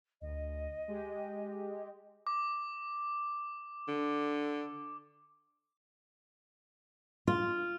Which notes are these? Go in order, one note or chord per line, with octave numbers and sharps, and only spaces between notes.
D2 D#5
G#3 G4
D6
D3
F4